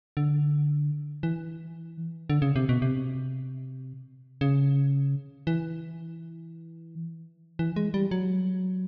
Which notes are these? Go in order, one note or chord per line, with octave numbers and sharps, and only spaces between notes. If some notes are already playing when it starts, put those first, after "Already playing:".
D3
E3
D3
C#3
C3
B2
C3
C#3
E3
E3
G#3
G3
F#3